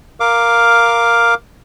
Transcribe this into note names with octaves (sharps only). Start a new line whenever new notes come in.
A#4 F5 D6